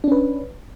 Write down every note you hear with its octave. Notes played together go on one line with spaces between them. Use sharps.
C#4 D4 B4